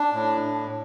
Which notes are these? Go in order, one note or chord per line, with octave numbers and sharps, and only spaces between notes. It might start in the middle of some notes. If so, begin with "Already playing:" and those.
Already playing: D4
A2